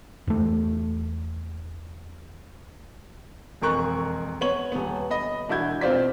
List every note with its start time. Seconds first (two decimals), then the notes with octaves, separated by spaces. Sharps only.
0.27 E2 A3
3.61 E1 F2 A#4 C#6 F#6
4.41 B3 C#5 F#7
4.72 D#1 B3
5.11 D#5 B5
5.49 E1 D4 E4 F#4 G6 G#6
5.81 B2 C4 F4 C5 D5 B6